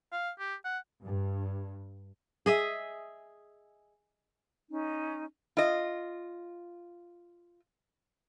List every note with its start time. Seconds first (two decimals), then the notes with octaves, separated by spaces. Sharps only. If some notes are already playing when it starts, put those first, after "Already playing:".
0.12 F5
0.39 G4
0.65 F#5
1.03 G2
2.46 G#4 D#5 E5
4.70 C#4 D#4
5.57 F4 D#5